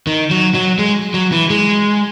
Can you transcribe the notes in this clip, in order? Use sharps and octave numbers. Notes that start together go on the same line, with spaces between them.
D#3
F#3
F#3
G#3
F#3
E3
G#3